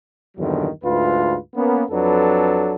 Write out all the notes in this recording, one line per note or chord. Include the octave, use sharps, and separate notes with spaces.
E2 G2 A#2 D3 D#3 F#3
D2 G#2 F4 B4
A#3 B3 C#4
F2 F#3 D4 A4 B4